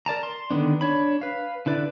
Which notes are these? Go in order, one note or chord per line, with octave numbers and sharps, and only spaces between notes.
A#4 D5 A5 A#5
C6
D3 D#3 B3 D4
D4 C#5 B5
B4 F5
D3 E4 B4 D5